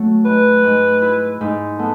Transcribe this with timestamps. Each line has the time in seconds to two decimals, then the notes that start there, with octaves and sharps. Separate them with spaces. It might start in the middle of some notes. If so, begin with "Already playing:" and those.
Already playing: F#3 A3
0.25 G#2 B4
0.64 G#2
1.02 E4
1.41 G#2
1.79 B3 A4